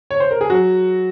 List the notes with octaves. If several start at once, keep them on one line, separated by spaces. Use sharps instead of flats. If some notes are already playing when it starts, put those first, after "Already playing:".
C#5
C5
A#4
G#4
F#3 F#4